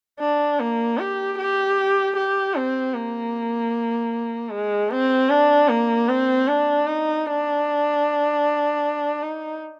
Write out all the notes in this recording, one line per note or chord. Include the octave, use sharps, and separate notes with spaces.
D4
A#3
G4
G4
G4
C4
A#3
G#3
C4
D4
A#3
C4
D4
D#4
D4
D#4